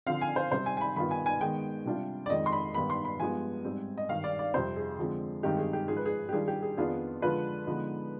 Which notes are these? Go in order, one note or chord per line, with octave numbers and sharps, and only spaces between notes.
D3 F3 C4 F5
G#5
C5
C3 G3 C4 C5
G#5
G#5
B5
G2 D#3 B3 F4 B5
G#5
G#5
D#3 G#3 B3 G5
C3 G3 D4 F4
D5
F2 D#3 G#3 D#5
C6
B5
G2 D#3 B3 B5
C6
B5
G2 F3 G#3 B3 G#5
G#2 G3 C4
D#5
G2 D#3 G3 F5
D5
D5
F2 C3 G3 C5
G#4
D3 F3 G#3 C4
G2 D#3 G#3 C4 D#4 G4
G#4
G4
G#2 F3 G#3 G#4
B4
G#4
G4
D#3 G3 D4 F4 G#4
G4
G#4
F2 D#3 B3 D4 F4 G#4
D3 F3 G#3 D4 F4 B4
D3 F3 G#3 B3 D#4